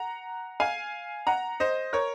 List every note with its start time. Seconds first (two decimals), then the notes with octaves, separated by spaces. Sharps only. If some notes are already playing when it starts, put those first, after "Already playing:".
Already playing: F#5 A#5
0.60 F5 G#5
1.27 F#5 A#5
1.60 C5 D#5
1.93 A#4 C#5